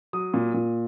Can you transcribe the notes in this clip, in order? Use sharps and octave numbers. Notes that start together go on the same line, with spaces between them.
F#3 D#6
A#2
A#2